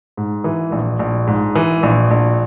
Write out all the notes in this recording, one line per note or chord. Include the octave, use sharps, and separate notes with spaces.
G#2
E3
A#1
A#1
G#2
E3
A#1
A#1